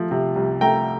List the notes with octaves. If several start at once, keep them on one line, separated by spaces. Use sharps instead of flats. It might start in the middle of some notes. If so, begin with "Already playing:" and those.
Already playing: F3 A3
C3
C2
A3 G5 A#5